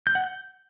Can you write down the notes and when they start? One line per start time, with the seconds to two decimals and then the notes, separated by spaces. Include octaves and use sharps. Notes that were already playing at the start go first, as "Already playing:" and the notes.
0.07 G6
0.15 F#5
0.24 G6